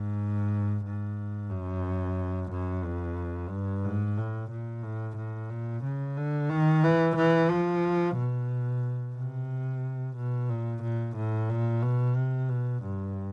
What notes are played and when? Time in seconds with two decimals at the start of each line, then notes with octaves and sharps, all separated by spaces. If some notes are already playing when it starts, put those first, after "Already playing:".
Already playing: G#2
0.84 G#2
1.50 F#2
2.51 F#2
2.84 F2
3.50 G2
3.84 G#2
4.17 A2
4.50 A#2
4.83 A2
5.16 A2
5.50 A#2
5.83 C#3
6.17 D3
6.49 D#3
6.84 E3
7.16 E3
7.50 F3
8.17 B2
9.16 C3
10.16 B2
10.50 A#2
10.82 A#2
11.16 A2
11.50 A#2
11.82 B2
12.15 C3
12.49 B2
12.83 G2